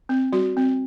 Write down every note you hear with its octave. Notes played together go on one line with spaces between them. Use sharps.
C4
G3 F#4
C4